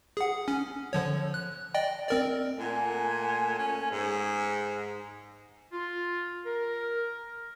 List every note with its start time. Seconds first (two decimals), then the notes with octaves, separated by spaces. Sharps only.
0.17 G#4 F#5
0.48 C#4
0.93 D3 F3 C#5
1.34 F#6
1.74 D5 D#5 G5
2.09 C4 A#4 D5
2.59 A#2 A3 F#5 G#5
3.58 C#4
3.91 G#2
5.73 F4
6.46 A#4